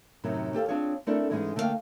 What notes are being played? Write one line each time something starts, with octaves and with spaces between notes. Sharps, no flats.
F#2 A2 C3 D#3 F#3
D#2 G4 A4 F5
C4 D4 F4 G#4 C#5
A3 C4 D4 E4 A4 A#4
G#2 E3 G#3 C#4 D#4 G#4
D3 A3 A#3 E4 F5 G5